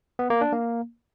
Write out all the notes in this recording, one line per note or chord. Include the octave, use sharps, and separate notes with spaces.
B3
A#3
D4
A#3